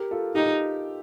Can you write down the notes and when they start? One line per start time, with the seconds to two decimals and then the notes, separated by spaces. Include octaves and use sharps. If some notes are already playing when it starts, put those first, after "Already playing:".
Already playing: G4 A#4
0.11 F4 A4
0.35 D#4 G4